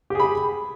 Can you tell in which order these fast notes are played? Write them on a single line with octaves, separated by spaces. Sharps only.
G4 G#4 B5